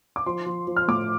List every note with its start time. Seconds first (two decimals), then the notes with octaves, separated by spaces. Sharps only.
0.16 D6
0.26 F3 C6
0.46 F3
0.67 F3
0.76 F6
0.88 A2 D6